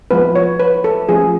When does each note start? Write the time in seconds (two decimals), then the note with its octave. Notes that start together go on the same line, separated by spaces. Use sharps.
0.11 F3 G#3 B3 B4
0.35 C#5
0.60 B4
0.84 A4
1.09 F3 A3 C#4 G#4